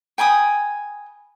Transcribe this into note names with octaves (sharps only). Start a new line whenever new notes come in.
G5 G#5 B5 D#6